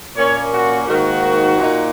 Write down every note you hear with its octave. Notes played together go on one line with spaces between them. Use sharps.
A#2 A#3 C#4 C#5
F#4
G#2 D#3 A#3 F#4
A#2 A#3 D#4